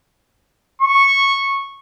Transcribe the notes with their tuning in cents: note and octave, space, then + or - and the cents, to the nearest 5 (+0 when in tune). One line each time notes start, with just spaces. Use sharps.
C#6 -10